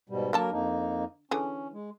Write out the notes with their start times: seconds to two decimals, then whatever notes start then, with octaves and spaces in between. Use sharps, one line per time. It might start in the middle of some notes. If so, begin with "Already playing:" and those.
0.09 G#2 B2 G3
0.33 D3 F#3 A#3 A4 A#4 A5
0.52 F2 A#3 D#4
1.31 D3 E3 C#4 G#4
1.73 G#3